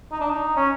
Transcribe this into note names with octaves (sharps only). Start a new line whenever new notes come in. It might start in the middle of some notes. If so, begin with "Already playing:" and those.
D#4
D4
D#4
C#4